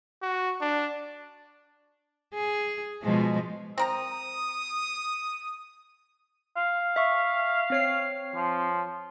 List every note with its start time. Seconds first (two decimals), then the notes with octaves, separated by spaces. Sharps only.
0.22 F#4
0.61 D4
2.34 G#4
3.03 B2 F3 G#3
3.78 C4 A#4 A#5 D#6
6.57 F5
6.96 E5 C#6
7.70 C4 C#5 C7
8.36 F3